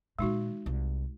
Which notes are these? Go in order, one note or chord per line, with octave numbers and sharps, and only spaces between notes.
A#2 D#3 G#3 D#4 F#4
C2